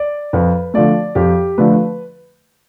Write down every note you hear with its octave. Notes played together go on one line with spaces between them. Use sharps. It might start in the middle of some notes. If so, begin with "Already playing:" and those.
Already playing: D5
F2 B4
D3 F3 A3 D5
F2 G4
D3 F3 A3 B4